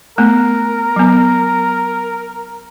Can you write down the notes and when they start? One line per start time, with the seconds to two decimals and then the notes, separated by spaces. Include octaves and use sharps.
0.18 A3 B3 A#4
0.96 F#3 B3